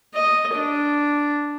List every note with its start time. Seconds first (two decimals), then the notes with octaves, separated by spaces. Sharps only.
0.15 D#5
0.55 D4